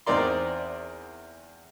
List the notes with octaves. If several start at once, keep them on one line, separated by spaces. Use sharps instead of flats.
E2 C4 D#4 A#4 D5 C6